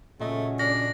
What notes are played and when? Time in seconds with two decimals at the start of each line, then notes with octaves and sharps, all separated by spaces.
0.20 A#2 C#3 F#3 A3 C#4 D#5
0.59 D4 A#6